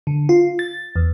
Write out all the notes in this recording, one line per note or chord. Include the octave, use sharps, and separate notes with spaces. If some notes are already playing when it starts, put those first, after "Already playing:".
D3
F4
A6
E2